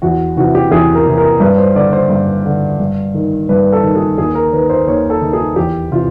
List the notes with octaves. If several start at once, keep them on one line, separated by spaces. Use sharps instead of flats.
E2 F#4
C3 E3 F#4
G4
E2 G#4
A#4
C3 E3
A#4
G2 B4
C5
D3 D5
C5
G2
D3
G2
D#3
G2 B4
A4
D#3
G#4
D#2 G#4
A#4
D#3 B4
C5
D#2 C#5
A4
D#3
G#4
E2 G4
C3 E3 F4